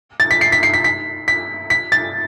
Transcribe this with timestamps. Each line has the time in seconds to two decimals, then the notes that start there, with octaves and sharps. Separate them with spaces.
0.20 A6
0.31 B6
0.41 C7
0.52 B6
0.63 C7
0.74 B6
0.84 B6
1.28 B6
1.70 B6
1.92 A6